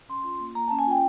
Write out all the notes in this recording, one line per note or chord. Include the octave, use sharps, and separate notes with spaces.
C#4 C6
F4
A#3
A#3 A#5
A5
C#4
G#5
F4 G5